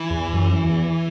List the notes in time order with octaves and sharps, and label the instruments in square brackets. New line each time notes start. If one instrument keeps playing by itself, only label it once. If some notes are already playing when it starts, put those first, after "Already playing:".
Already playing: [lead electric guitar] E3
[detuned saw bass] E2
F#2
E2